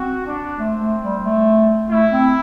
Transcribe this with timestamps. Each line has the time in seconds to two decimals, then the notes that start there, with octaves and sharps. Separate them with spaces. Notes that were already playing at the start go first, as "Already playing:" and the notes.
Already playing: C4 F#4
0.26 D4
0.59 A3 C4
0.81 A3
1.03 G3
1.25 A3
1.90 A3 E4
2.12 C4